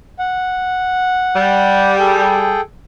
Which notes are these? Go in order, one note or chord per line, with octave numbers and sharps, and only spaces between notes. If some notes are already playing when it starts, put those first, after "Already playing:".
F#5
G3
G#4 A4 G5